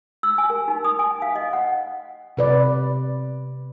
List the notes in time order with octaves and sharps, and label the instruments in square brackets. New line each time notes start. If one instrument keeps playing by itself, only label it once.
[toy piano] E6
G#5
A#4
D#4
D#6
G#5
F5
D#5
F#5
[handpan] C3 B4 D5